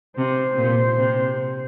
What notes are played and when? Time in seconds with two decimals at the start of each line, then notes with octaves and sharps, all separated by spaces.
0.18 C3 C5
0.58 A#2
0.98 C3